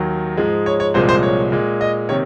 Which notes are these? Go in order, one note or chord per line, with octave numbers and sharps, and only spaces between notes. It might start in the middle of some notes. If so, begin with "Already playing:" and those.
Already playing: D#2 D#3 F#3
G#2 F3 G#3
C#5
C#5
C2 A#2 F3 G#3 C5
C5
C#5
A#2 G#3
D#5
C3 D#3 A#3 C#5